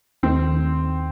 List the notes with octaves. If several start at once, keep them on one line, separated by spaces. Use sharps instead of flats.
D#2 D#3 A3 C4 D#4